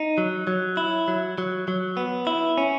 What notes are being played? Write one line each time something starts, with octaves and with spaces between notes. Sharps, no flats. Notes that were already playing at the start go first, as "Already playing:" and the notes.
Already playing: D#4
F#3
F#3
E4
F#3
F#3
F#3
B3
E4
C#4